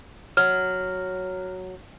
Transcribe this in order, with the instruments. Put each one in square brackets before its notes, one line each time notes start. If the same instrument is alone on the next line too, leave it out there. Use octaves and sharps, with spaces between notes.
[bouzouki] F#3 [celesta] F6